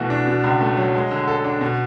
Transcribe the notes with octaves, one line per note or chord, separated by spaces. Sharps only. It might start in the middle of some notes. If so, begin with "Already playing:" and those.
Already playing: B2 E3 A3 F#4
D4
B2
C#2
A3
F#3
G#3
D3
A4
D4
B2